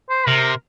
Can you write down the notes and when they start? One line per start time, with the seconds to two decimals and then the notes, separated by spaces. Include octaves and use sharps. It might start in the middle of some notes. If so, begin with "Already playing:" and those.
0.09 C5
0.27 C3 A#4